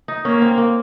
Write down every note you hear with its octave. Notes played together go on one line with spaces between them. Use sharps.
D#4
A#3 C#4
C4
A#3